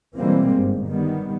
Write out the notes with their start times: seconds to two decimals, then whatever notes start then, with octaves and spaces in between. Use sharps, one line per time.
0.16 B2 E3 G3 G#3 A#3 C4
0.54 G1 G#2
0.87 D#3 G3 B3